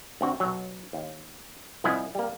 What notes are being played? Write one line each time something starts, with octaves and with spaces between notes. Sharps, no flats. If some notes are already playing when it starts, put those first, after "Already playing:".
D2 C4 F#4
B1 F#3
D#2
C2 F3 E4 D#5 F#5 G#5
G3 A#3